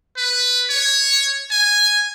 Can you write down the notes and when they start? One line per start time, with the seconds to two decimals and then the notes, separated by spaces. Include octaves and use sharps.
0.17 B4
0.70 C#5
1.51 G#5